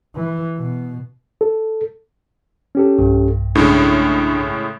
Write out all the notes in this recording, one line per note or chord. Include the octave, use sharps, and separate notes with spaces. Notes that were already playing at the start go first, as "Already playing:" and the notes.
E3
B2
A4
C#4 G4 A4
B1 G2
A2 C#3 G#3 D4